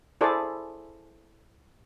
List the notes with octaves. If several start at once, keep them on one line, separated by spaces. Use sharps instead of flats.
E4 G#4 A4 C5 D5